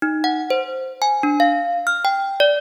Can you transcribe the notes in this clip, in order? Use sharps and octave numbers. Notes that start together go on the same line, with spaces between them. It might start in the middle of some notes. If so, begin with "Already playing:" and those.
D#4
F#5
C5
G#5
D4
F5
F6
G5
D5